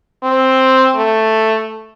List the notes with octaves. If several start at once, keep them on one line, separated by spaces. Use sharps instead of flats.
C4
A3